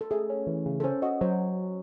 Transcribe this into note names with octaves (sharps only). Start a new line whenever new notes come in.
A4
A3 G#4
C#4
E3
C#3
A4
C#4 C5
F#4 D#5
F#3 C5